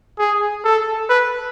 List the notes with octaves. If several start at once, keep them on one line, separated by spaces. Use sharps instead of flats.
G#4
A4
B4